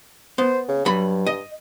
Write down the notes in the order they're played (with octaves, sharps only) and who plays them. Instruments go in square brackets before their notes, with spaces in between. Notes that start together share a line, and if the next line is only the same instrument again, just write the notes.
[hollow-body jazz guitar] B3 [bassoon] C5
[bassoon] C#3
[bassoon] G2 [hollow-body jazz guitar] F#3 B5
[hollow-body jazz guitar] D#5